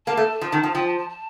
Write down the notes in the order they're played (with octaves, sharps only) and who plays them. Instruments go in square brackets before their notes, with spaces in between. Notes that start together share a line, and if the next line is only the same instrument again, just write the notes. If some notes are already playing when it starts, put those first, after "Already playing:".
[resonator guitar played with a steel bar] A#3 [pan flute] A5
[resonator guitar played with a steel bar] A3
F3
D#3
F3
[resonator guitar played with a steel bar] F3 [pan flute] G5
[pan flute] A5
A5
A5